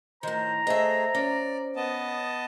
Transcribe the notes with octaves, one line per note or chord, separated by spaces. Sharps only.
A2 D#3 C5 A#5
A3 G#4 C5 D#5 E5
C#4 D5
B3 D#5 A5